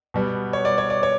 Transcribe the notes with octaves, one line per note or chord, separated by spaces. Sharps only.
B2 G3 B3
C#5
D5
C#5
D5
C#5